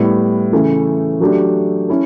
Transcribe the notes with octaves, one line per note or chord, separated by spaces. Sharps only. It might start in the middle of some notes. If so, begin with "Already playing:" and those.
Already playing: A2 G3 B3
C#3 E3 A3
F#3 A3 D4 G4
C#4 E4 A4